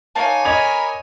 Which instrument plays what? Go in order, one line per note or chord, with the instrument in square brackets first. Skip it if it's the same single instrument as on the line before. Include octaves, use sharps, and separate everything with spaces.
[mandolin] A#3 D#4 A5 [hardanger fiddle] C#5 G#5
[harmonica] A#4 B5 [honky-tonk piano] D#5 G#6 F7 [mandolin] D6